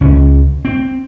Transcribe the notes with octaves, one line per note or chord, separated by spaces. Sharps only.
C#2 C#4
C4